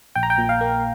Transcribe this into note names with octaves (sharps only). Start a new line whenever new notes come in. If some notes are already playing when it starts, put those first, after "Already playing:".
A#1 G5
A#5
G5
A#2
F5
A#3